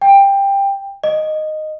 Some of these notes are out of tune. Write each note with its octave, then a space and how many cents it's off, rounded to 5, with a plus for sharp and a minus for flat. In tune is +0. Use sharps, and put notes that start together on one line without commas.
G5 +15
D#5 -10